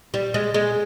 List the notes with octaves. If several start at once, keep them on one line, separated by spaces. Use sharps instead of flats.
G3
G#3
G#3